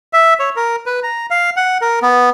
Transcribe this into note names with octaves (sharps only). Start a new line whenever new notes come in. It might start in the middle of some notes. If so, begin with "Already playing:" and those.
E5
C#5
A#4
B4
A#5
F5
F#5
A#4
B3